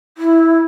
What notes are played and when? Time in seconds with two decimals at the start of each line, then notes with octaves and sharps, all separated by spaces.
0.18 E4